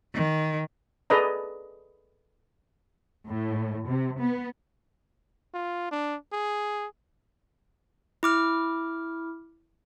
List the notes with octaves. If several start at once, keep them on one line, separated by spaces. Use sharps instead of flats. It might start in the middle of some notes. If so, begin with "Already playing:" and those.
D#3
G#4 A4 B4 D5 D#5 A#5
A2
C3
B3
F4
D4
G#4
E4 D6 F6